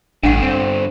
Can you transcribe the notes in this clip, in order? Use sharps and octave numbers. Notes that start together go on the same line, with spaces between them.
A1 G2 D3 D4 F#5
C4